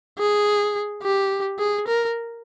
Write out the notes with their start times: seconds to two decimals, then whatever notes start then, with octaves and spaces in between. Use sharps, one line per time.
0.18 G#4
1.03 G4
1.59 G#4
1.87 A#4